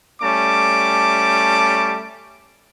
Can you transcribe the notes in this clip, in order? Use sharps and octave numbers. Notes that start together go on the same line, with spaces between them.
G3 A3 C#4 A5 D6